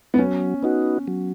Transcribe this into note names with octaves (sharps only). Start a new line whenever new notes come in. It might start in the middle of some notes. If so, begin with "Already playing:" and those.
B3
F#3 C#4
B3 D#4 F#4
F#3